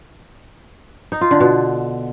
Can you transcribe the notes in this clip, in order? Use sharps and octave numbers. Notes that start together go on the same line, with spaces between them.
D#4
F4
D3
B2